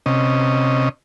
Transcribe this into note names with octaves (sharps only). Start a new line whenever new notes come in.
C3 C#4 D#5